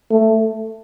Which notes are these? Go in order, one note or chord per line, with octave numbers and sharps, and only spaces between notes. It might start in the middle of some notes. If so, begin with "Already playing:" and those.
A3